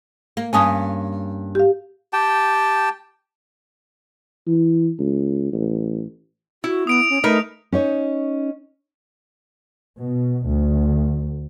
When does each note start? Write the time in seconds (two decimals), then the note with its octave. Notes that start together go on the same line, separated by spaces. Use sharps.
0.37 A#3
0.53 G2 A#3 C#4 G#5 A5 D#6
1.55 G4 F5
2.13 G4 G5 A5
4.47 E3
4.99 C#2
5.52 A1
6.64 E4 F#4
6.87 B3 D#6 D7 F7
7.10 C#4
7.24 A3 D#4 A#4 B4
7.72 C#4 D#4 C#5
9.98 B2
10.47 D2